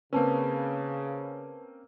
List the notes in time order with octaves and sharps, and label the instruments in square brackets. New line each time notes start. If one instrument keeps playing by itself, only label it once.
[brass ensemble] C#3 [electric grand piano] A#3 C4 C#4 [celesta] B4 A5